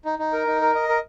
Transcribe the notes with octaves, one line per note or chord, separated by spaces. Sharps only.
D#4
D#4
A#4
D#4
A#4
D#5
A#4